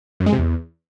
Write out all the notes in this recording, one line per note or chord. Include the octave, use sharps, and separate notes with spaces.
F#2
G#3
C3
E2